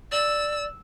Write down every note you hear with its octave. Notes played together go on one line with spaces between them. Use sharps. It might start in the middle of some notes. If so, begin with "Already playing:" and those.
D5 E6